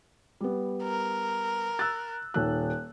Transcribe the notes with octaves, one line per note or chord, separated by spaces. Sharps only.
G3 B3
A#4
E6 F#6 A6
D#1 D#3 F#6